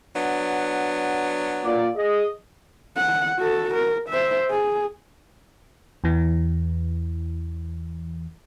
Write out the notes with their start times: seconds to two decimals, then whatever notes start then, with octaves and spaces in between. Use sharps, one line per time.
0.14 F#3 B3 D4
1.64 A#2 D5
1.96 G#4 D#5
2.97 F#5
3.39 F#4 A4
3.75 A#4
4.09 C5 E5
4.50 G#4
6.04 E2 E3